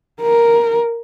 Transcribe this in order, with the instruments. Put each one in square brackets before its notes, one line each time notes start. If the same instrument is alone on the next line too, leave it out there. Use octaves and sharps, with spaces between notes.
[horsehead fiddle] A#4